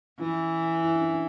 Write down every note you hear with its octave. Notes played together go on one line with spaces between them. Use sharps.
E3 C#4 E4
E4
D4
C#4
D4